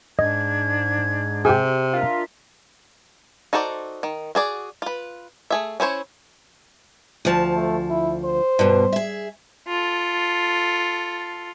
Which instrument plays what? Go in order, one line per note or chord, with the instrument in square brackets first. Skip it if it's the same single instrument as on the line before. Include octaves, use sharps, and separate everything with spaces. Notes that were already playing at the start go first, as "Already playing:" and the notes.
[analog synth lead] G#2 [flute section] D4 G#6 [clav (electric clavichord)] D#5
[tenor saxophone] C3 [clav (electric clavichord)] G4 G#4
[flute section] D4 A#4 E5 [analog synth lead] F4
[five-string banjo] D#4 F#4 A4 C5 D5
D#3
F#4 G#4 D5
F4 B4
A3 G#4 E5
C#4 E4 C5 C#5
[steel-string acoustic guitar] D2 F3 A5
[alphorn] A3
E4
C5
[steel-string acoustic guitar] G2 B2
G#4 E5
[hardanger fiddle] F4 A4